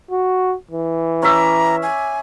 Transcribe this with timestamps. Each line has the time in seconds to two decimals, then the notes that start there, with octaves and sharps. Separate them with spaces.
0.11 F#4
0.71 E3
1.22 C#4 E5 A#5 D6
1.83 G#5